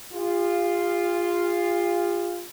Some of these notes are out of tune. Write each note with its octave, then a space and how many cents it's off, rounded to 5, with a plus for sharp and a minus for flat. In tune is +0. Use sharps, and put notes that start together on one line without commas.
F4 +0 G#4 -45